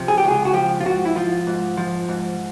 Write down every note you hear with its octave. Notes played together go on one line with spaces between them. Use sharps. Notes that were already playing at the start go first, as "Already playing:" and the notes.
Already playing: C3 F3
G#4
G4
C#2 G#4
F#4
F3 G4
F4
G#2 F#4
E4
F3 F4
G#2
F3
G#2